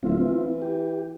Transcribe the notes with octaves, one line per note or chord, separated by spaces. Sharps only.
D1 C4 E4 F4
E3
G4